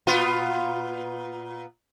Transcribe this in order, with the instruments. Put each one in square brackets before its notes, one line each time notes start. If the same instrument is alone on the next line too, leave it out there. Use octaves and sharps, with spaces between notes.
[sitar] A#2 B3 F4